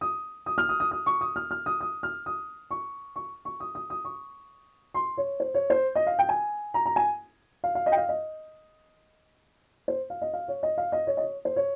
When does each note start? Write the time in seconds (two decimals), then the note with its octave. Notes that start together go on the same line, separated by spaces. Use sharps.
0.01 D#6
0.46 D#6
0.58 F6
0.69 D#6
0.80 D#6
0.91 D#6
1.06 C#6
1.21 D#6
1.36 F6
1.51 F6
1.66 D#6
1.81 D#6
2.03 F6
2.26 D#6
2.71 C#6
3.16 C#6
3.45 C#6
3.60 D#6
3.75 D#6
3.90 D#6
4.05 C#6
4.94 C6
5.17 C#5
5.40 C5
5.54 C#5
5.70 C5
5.95 D#5
6.07 F5
6.19 G5
6.29 G#5
6.74 A#5
6.86 A#5
6.96 G#5
7.64 F5
7.75 F5
7.86 D#5
7.92 G5
7.97 F5
8.09 D#5
9.88 C5
10.10 F5
10.22 D#5
10.33 F5
10.48 C#5
10.63 D#5
10.78 F5
10.92 D#5
11.07 C#5
11.17 D#5
11.23 C#5
11.45 C5
11.56 C#5